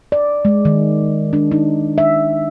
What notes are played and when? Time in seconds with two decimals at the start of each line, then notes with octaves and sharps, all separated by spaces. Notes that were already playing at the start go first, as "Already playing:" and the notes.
0.12 D5
0.45 G#3
0.65 D#3
1.33 D4
1.51 D#4
1.98 E5